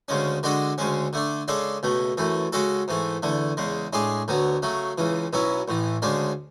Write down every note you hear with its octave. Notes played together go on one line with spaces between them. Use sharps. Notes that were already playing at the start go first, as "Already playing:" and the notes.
D2 C#3 G#3 C#4
D3 G#3 D4 F#4 A4
D2 C#3 G#3 C#4
D3 A3 D4
C#3 G#3 D4 A4
C#2 B2 A3
F#2 E3 A3
C#3 G#3 C#4 F#4 A4
G#2 E3 A3
E2 D3 A3
E2 C#3 G#3
A2 G#3 D4 G#4
D2 D3 F#3 B3
C#3 F#3 A3
C#2 C#3 E3
B1 B2 F#3 C#4 E4
A1 A2 E3
D2 C#3 G#3 D4